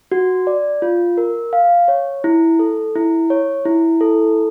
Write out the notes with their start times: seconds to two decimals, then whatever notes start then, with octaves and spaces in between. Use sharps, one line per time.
0.12 F#4
0.47 D5
0.82 F4
1.17 A#4
1.53 F5
1.88 C#5
2.24 E4
2.59 A4
2.96 E4
3.30 C#5
3.65 E4
4.01 A4